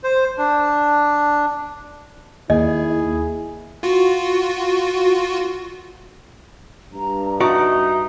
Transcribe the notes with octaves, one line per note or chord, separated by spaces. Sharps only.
C5
D4
D#2 E4 G#4 D#5
F4 F#4
G2 A#5
D#4 F#4 D5 E5 A#5